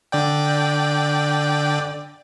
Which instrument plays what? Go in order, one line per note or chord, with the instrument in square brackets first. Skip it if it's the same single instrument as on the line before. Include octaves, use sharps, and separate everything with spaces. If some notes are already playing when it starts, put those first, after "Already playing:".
[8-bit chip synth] D3 D5 G5